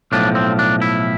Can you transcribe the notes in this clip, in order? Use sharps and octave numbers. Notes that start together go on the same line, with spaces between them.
B1 A2 F3 D4
C4
D4
E4